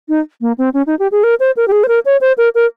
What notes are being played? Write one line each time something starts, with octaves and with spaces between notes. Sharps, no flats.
D#4
A#3
C4
C#4
D#4
G4
G#4
A#4
C5
A#4
G4
G#4
C5
A#4
C#5
C5
A#4
A#4